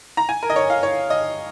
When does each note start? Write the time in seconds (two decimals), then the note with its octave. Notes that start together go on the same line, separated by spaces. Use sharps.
0.17 A#5
0.29 G#5
0.43 A#4
0.50 D#5
0.56 C#5
0.70 F5
0.83 C#5
1.10 D#5